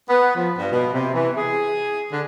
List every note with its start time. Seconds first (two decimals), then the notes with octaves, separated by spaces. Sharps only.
0.08 B3
0.36 F3
0.58 G2
0.72 B2
0.94 C3
1.14 E3
1.37 G#4
2.12 D3